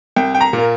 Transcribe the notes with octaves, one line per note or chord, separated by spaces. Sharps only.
C2 G5
G5
A#5
A#2
A#3